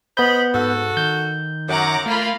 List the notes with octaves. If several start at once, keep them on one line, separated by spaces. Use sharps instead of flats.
B3 C5 D#5 B5 G6
G#2 F#4 A4
D#3 G6
F#2 F#5 A#5 D6
A3 A#3 F4 A#4 B5